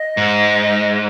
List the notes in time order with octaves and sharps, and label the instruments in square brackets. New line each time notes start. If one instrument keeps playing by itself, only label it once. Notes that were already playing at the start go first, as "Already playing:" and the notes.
Already playing: [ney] D#5
[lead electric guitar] G#2